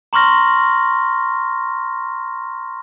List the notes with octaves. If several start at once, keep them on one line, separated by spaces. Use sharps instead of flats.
A#5 C6 C#6 F6 A#6